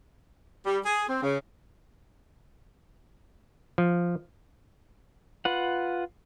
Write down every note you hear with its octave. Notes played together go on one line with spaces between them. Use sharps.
G3
G#4
C4
C#3
F3
F4 B4 F#5